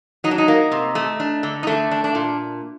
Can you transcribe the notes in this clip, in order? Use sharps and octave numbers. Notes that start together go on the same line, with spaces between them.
F#3 D#4
D4
D#4
A#3
C3
A3
D4
D3
D#4
A3 D4
D4
D4
A#2